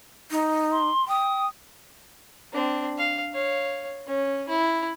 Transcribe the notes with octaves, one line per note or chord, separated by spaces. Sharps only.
D#4
C6
G5 D#6
C4 D4
F5
C#5 F5
C#4
E4